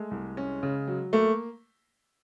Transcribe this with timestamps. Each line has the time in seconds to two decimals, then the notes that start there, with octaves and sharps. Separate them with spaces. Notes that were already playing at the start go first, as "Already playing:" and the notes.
Already playing: G#3 A3
0.11 C2
0.37 C#4
0.63 C#3
0.87 F#3
1.13 A3 A#3